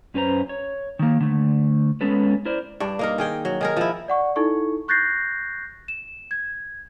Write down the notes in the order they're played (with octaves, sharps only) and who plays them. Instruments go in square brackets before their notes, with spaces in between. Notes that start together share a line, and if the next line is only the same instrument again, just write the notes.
[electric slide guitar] F#2 C#4 B4 C5 A#5
C#5
D#3 A#3
D3 A3
G#3 B3 C#4 A4 B4
E4 A#4 C5 D5
[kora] G2 D4
A#3 D#4 A#4
D#3 G#4 G5
F#3
D#3 G#4 A#4
F3 E4
[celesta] D5 F#5 C#6
D#4 E4 A4 C#6
C#6 F#6 G6 A6 A#6 C7
E7
G#6